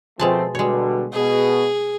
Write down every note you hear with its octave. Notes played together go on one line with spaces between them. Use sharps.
B2 F3 G#3 A3 C4 A5
B2 D3 G3 G#3 C#5
B2 G#4